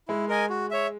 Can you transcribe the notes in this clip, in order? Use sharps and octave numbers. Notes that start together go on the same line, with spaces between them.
G#3 E4
A#4 D#5 G#5
F#4
C#5 E5